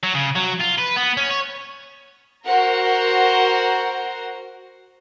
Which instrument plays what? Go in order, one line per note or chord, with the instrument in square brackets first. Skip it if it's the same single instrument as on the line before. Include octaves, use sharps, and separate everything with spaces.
[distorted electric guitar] F#3
C#3
F#3
F4
B4
B3
C#4
C#5
[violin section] F#4 A#4 C5 F#5 A#5